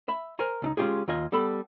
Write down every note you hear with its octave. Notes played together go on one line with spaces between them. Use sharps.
E5 B5
A#4 C5 G#5 A#5
C#2 D4 D#4
G#3 C#4 D#4 F4 G4 G#4
D#2 F4 D#5 G#5
G3 B3 A4 A5 B5